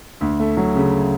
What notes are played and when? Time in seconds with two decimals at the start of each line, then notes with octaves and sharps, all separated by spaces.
0.21 D2
0.39 A3
0.57 F#3
0.75 C#3